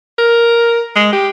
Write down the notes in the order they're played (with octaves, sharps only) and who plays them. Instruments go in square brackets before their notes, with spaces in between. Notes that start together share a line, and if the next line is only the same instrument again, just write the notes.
[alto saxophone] A#4
G#3
G4